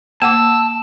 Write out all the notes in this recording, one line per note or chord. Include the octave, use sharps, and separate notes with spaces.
A#3 F#5 A5 D6 E6 E7